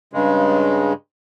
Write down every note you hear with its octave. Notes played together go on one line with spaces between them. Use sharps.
G2 C#3 G#3